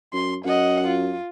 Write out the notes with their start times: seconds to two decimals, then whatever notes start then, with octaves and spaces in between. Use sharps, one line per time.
0.14 F#2 C6
0.45 F#2 D#5 F#5
0.87 F4